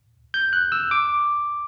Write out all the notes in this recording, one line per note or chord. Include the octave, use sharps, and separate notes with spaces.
G6
F#6
E6
D6